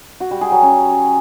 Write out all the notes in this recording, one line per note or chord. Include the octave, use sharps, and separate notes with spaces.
F#4
G3
G#4
F#3
C#4